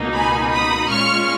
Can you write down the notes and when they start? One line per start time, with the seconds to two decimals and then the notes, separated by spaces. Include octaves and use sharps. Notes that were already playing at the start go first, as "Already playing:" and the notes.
Already playing: C#2 B2 A#3 D#4
0.13 G#5 B5
0.51 B5 D#6
0.89 A#2 G#3 C#4 F4 C#6 F6